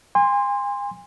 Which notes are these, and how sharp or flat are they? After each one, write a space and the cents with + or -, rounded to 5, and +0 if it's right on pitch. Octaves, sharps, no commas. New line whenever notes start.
G#5 -40 C6 +0